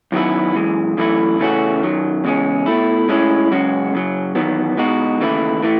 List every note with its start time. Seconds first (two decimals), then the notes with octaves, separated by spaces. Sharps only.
0.12 F#2 D#3 F#3 B3 E4
0.55 F#2 E3 G#3
0.97 F#2 E3 A3 E4
1.39 C#3 E3 A3 C#4 F#4
1.82 F#2 D#3 F#3
2.24 E2 C#3 G#3 C#4
2.66 B2 A3 E4
3.09 A2 G#3 C#4 E4
3.51 F#2 C#3 G#3 C#4 F#4
3.93 F#2 C#3 F#3
4.35 E2 D#3 F#3 B3
4.77 B2 G#3 D#4 F#4
5.21 D#2 C#3 E3 A3 E4
5.62 A2 E3 A3